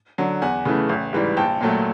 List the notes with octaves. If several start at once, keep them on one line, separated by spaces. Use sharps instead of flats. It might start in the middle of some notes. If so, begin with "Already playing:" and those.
D3 F#3
E2 F#5 G#5
C#3 E3 A3
A1
G#2 E3 G3
A#1 G5 A5
A#2 F#3 A3